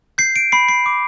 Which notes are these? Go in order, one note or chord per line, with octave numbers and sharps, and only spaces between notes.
G6 C7
D7
B5 C7
C7
D6